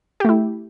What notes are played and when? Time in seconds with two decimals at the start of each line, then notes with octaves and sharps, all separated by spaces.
0.20 G4
0.25 A3
0.29 E4